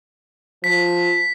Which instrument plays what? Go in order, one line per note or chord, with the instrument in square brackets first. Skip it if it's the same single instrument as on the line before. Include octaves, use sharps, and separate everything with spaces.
[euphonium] F3 [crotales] B6